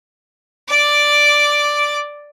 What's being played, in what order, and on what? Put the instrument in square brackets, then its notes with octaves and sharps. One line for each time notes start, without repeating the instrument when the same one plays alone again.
[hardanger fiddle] D5 D6